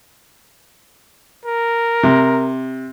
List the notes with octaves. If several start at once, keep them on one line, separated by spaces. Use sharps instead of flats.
A#4
C3